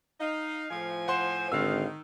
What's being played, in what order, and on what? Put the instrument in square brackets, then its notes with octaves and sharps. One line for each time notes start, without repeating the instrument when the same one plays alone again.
[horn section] D#4 [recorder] F5
[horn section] A2 F3 G#5
[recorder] C5 [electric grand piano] F#5 C6
[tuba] G#1 [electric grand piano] D3 E6 [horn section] D#3 [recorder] F5